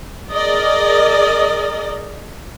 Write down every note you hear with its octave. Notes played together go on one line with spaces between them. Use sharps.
G#4 A#4 D5 D#5